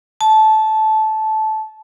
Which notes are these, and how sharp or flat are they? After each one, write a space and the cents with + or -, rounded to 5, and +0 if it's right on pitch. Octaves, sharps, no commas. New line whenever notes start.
A5 -15